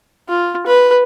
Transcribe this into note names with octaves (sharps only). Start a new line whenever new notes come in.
F4
B4